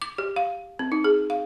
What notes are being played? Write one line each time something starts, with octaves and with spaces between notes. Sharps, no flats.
D6
G4
F5
C4
D#4
G#4
F5